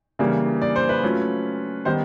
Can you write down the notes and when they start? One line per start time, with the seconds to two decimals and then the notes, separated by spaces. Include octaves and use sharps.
0.19 C#3 E3 G3 A#3 D4
0.62 D5
0.76 C5
0.89 B4
1.02 F#3 A3 C#4 F4
1.85 D#3 G3 B3 C5